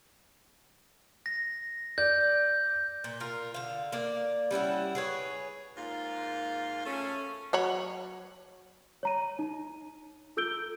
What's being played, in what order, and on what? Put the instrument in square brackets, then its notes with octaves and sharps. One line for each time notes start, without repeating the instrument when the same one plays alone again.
[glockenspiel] A#6
[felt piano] D5 [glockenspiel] G6
[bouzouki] A#2
F4 A#4
D3 F5
A#3 D5
G3 C#4 E4 F#5
G#4 B4 C#5
[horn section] G#2 A#3 F4
A3 C#4
[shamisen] F#3 C#5 B5
[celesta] C#5 A#5 D#7
D#4
F4 A4 E6 G6 D7 G7